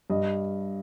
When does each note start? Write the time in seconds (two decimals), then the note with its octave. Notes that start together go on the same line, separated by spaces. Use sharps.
0.10 G2 D#5